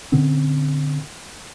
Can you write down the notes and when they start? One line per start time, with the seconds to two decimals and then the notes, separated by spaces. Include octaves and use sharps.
0.12 A#2 D3 C4 C#4